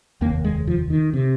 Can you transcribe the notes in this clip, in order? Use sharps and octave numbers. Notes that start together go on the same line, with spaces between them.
F1 D#2 A#3
G#3
F3
D#3
C3